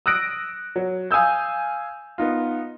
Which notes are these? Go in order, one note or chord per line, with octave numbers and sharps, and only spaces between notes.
D#6 E6 F#6 A#6 D7
F#3
F5 G#5 D#6 E6 G6
B3 D#4 F4